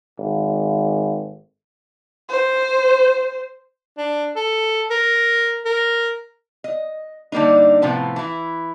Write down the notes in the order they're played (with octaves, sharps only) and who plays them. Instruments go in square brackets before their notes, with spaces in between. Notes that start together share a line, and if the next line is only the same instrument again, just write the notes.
[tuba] G#1
[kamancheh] C5
[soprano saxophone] D4
A4
A#4
A#4
[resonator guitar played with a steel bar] D#5
D3 G3 A#3 D4 D#4
A2 C3 F3 B3
E3 E4